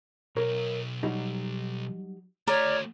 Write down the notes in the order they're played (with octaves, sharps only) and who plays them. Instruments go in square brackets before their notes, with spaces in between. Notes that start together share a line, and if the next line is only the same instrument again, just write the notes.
[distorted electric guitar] B1 [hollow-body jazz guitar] A#4 C#5
[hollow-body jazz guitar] F#3 G3 D#4
[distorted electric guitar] A3 F#4 [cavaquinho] A#4 D5 [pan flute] C#5